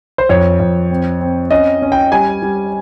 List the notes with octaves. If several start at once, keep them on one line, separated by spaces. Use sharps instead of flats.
C5
F2 C#5
F2
C4
C4
C#4 D#5
C#4
G5
G3 G#5
G3